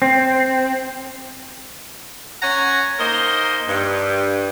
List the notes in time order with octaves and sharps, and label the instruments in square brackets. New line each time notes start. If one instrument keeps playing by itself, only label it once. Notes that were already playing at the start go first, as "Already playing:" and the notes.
[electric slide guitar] C4
[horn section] C#4 C#5 F#5 G#5 A#5
A#3 D#4 A#4 C5 D#5
G2